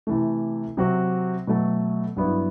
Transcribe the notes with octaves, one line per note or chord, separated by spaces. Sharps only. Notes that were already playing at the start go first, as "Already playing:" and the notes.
C3 E3 A3
C3 F#3 C4 F#4
B2 F#3 A3
G2 F#3 B3 E4